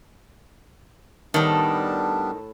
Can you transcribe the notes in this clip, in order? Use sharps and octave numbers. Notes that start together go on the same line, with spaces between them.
A2 D#3 G3 B3 D4 A4